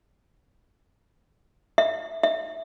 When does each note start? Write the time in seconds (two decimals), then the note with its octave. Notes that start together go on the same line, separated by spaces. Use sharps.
1.78 E5
2.23 E5